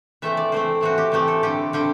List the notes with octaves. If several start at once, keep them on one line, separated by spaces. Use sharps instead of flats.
E3 A3 C4 E5
D5
E3 A3 C4 C5
E3 A3 C4 F#4
G4
E3 A3 C4 G4
A4
D3 G3 C4 G4
D3 G3 C4 G4